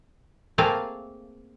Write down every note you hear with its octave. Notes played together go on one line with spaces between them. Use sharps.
A3 A#3 C4 G#4 F5